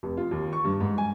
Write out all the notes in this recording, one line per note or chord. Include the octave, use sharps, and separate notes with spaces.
F1
F4
D#2
C#6
G2
G#2
G#5